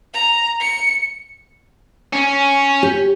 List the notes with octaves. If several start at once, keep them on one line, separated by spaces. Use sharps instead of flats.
A#5
C#7
C#4
G4